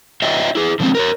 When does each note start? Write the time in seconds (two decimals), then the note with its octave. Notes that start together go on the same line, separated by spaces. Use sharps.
0.22 F4 C#5 D#5 E5 G5
0.55 E4 G#4
0.80 D3 F3 G#3 A#3 C4 C#4
0.95 A#4 B4 C#5